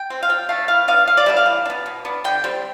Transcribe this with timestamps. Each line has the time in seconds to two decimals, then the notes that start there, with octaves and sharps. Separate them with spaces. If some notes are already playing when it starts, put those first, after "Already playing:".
Already playing: G5
0.10 C4
0.23 F5
0.29 F3 G5
0.49 A3 D4 F5
0.68 E3 F5
0.88 B3 D4 F5
1.07 D3 F5
1.17 D5
1.26 G3 B3 D4 E5
1.37 F5
1.46 E3
1.66 D4
1.70 B3
1.86 B2
2.05 B3 D4
2.24 D3 G5
2.44 G3 C4